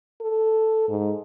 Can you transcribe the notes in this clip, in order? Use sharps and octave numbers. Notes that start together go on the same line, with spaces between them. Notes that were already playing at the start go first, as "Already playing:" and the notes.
A4
G#2